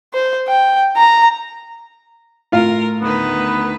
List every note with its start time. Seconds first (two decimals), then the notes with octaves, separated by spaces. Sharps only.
0.14 C5
0.48 G5
0.96 A#5
2.52 A2 F4 A#4 F5
3.01 D2 D#3 B3 B4